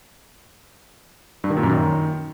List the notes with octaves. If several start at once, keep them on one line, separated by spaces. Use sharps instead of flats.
G2
D#3
A#2
F#2
D#3